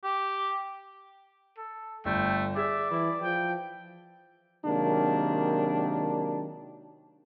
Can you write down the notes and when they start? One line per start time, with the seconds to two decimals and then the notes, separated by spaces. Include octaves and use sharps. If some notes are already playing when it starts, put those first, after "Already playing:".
0.03 G4
1.58 A4
2.05 G1 A3 G5
2.56 G#4 D5 E5
2.91 E3 E4
3.21 F3 G5
4.65 C3 D#3 F#3 G#3 A#3 D4